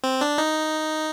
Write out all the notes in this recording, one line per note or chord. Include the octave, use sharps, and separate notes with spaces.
C4
D4
D#4